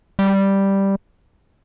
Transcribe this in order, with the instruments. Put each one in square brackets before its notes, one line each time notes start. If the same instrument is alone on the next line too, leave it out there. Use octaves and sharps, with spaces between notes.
[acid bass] G3